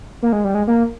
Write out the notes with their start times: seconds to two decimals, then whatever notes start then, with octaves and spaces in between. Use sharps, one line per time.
0.22 A#3
0.32 G#3
0.44 G3
0.55 G#3
0.67 A#3